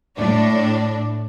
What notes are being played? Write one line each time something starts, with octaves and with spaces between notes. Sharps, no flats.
A2 D4